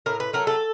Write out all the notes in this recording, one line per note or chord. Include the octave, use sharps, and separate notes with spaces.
A2 A#4
B4
F#3 A3 A#4
A4